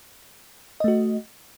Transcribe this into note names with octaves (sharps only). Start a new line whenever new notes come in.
A3 F#4 D#5